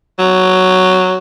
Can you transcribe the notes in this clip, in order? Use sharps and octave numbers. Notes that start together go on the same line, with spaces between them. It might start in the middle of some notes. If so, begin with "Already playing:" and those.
F#3